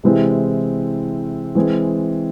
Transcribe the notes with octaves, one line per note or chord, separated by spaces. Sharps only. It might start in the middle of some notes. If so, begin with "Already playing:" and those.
C3 E3 G#3 C4 E4
E3 G#3 C4 G#4